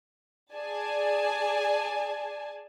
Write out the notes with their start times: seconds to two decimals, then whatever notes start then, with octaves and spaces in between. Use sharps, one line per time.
0.55 G#4 D5 G#5 A5